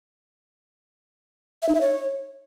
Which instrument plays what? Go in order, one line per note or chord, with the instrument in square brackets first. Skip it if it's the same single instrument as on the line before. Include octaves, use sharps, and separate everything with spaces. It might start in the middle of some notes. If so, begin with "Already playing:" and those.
[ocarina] E5
D#4
E5
C#5